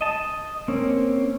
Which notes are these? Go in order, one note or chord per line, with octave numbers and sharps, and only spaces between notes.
D#5 A5
A#3 C4 C#4